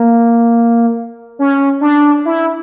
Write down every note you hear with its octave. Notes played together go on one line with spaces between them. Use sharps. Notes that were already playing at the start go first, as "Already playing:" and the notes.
Already playing: A#3
C#4
D4
E4